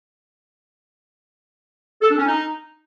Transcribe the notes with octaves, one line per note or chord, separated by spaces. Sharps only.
A4
D4
C#4
D#4